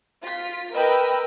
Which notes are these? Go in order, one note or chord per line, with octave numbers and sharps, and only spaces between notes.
F4 B6
A#4 B4 D#5 G5 B5 E6